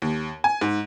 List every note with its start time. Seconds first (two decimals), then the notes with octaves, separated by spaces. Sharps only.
0.02 D#2
0.44 G#5
0.61 G#2